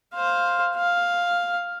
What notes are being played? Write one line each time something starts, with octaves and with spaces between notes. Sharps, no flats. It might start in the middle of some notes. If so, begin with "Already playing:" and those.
C5 F5
F5